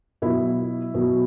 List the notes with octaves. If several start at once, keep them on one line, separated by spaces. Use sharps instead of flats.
B2 F#3 E4
B2 F#3